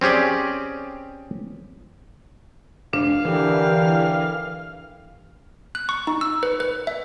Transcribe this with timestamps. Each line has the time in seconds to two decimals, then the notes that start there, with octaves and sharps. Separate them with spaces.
0.01 C4 C#4 G4 G#4 D5
2.93 F1 D4 F5
3.25 D3 E3 G4 A#4
5.75 F#6
5.89 C#6
6.07 D#4
6.21 E6
6.43 B4
6.60 B4
6.87 E5